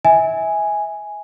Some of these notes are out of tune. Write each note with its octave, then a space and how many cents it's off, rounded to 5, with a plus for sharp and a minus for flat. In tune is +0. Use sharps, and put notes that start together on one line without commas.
E5 -30 G#5 +0